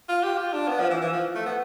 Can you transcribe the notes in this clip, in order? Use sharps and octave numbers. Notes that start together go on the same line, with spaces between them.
F4
G4
F4
D4
B3
F3
E3
E3
F3
A3
B3